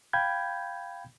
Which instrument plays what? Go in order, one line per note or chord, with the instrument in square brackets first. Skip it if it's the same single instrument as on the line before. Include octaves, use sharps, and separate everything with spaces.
[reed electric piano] F5 G5 B5 G6 G#6